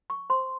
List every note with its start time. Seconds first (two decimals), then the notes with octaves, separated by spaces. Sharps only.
0.10 C#6
0.30 C5 C6